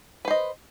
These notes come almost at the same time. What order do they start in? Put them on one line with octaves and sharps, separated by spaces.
B4 C5 D#5